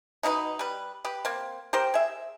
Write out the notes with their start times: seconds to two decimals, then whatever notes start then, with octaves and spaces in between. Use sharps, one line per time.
0.23 B2 D#4 E4 B4
0.59 G3 B4
1.05 G4 B4
1.25 A#3 C4
1.73 G4 A#4 C5 G5
1.94 G#4 E5